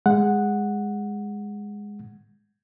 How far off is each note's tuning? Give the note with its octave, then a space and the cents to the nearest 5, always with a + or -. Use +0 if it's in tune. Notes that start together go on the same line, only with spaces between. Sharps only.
G#3 -15 F#5 -5